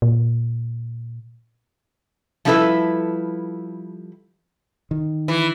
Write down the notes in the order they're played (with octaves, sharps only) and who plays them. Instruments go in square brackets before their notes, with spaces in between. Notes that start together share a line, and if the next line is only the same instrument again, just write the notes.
[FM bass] A#2
[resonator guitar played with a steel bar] F3 G3 D4 E4 A4 B4
[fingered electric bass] D#3
[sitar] E3